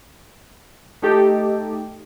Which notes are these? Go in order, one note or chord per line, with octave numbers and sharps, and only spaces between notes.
A3 D#4 G4 A4